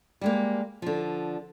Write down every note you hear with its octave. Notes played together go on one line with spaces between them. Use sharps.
G3 G#3 A#3
D3 F3